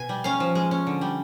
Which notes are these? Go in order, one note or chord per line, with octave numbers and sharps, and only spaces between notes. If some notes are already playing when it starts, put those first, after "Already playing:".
Already playing: B2 G#5
G3
C#4 F5
F3
G#3
C#4
D3
G3